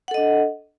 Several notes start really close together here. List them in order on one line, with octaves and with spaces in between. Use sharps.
F#5 A4 D#5 D4